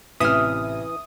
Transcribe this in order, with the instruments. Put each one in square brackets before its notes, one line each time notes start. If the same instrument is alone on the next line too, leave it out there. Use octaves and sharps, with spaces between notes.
[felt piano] A1 C3 [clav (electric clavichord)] E3 [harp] E5 F6 [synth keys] D#6